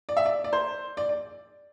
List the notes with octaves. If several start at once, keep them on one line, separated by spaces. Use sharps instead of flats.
D5
E5
D5
D5
C5
D5
D5